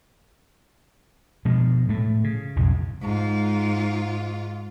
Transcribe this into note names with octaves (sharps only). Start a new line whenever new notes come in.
B2 F3 G#3
A2 A3
C#3
B1 F2 A2
G#2 F4